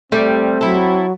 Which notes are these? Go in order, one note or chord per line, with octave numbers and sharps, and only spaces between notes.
G3 A3 C4
F#3 E4 A4